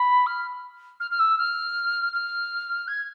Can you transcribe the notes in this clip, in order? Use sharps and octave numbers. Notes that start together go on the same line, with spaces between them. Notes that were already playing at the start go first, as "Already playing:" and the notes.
Already playing: B5
F6
F6
F6
E6
F6
F6
G#6